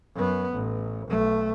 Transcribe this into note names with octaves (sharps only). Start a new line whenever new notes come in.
F#2 B3
A1
B1 A3